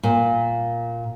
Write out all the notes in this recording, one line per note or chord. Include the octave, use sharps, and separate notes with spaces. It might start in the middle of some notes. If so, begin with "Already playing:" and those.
A#2